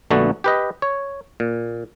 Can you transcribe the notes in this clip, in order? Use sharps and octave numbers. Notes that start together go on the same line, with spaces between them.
A#1 D3 A3 B3 F#4
G4 B4 D#5
C#5
A#2